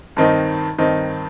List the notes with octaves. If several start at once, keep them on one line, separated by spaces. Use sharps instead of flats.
G2 D#3 C4 D#4
G2 D#3 C4 D#4